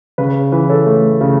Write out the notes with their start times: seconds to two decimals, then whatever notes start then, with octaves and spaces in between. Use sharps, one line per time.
0.18 C#3 B4
0.52 E3 B4
0.69 A4 C#5
0.86 A3
1.21 C#3